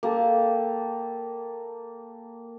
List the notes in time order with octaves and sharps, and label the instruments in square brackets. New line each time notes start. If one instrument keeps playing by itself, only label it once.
[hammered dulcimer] A#3 G4 A4